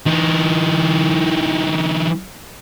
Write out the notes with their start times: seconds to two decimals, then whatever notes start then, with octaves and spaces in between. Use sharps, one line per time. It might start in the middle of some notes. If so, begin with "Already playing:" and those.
0.07 E3 D#4